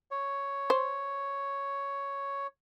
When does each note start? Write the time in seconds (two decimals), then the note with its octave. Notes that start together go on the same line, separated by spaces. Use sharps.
0.11 C#5
0.70 C5